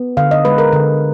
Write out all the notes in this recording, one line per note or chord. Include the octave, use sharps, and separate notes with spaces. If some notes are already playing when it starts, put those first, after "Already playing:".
Already playing: B3
D3 F5
D#5
G#3 B4
A#4
D3